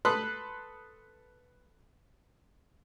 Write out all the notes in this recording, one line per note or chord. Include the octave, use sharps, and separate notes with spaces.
A4 B4 B5 C6 D#6 F#6